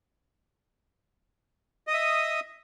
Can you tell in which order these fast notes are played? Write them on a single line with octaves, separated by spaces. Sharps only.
D#5 D#6 E5